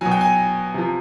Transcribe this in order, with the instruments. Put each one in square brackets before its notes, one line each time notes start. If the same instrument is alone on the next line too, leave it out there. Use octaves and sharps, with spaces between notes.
[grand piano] B2 F#3 G#5
G5
G#5
C3 F3